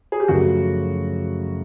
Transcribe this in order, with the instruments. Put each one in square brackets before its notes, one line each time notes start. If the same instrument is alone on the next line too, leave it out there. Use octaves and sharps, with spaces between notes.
[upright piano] G#4
G4
[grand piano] F#2 C#3 F3 A3 [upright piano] F#4